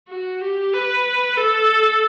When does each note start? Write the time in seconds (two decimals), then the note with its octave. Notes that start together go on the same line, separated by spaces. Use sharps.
0.09 F#4
0.41 G4
0.73 B4
1.37 A4